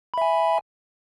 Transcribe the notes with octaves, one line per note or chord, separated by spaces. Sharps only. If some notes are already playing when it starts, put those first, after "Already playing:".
E5 G#5 B5